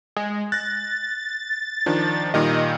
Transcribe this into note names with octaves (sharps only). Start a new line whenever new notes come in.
G#3
F#6 A6 A#6
D#3 F3 D4
A#2 D#3 G3 D#5